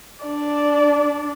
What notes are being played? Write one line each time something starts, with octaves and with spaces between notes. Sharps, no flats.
D4 D5